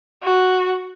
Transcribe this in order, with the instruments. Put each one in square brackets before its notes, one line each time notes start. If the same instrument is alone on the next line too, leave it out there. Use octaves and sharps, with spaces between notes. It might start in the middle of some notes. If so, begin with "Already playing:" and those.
[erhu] F#4